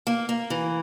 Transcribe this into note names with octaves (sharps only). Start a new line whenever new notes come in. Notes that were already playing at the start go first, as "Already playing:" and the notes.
A#3
A#3
E3